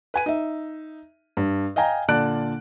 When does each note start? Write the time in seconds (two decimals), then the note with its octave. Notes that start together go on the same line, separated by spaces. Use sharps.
0.14 B4 G#5 D#7
0.26 D#4 E5
1.37 G2
1.76 D#5 F5 G5 G#5 A#5
2.08 A#2 D3 D5 A5 F#6 D7